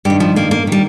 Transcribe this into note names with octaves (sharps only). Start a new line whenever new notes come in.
G2 D#3 G4
F3
A#3
A#3
D#3 G3